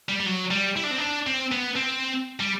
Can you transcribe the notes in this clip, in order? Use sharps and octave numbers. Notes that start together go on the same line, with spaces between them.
G3
G3
F#3
G3
E4
D4
C4
D4
C4
B3
C4
G3